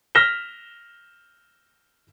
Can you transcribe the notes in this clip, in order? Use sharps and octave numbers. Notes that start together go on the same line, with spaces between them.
F6 A#6 B6 E7 G7